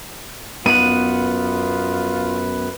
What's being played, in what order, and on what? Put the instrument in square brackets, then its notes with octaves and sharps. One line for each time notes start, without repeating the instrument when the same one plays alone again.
[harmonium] F#2 B4 [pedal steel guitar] B3 F#5 [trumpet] F4 [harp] D#7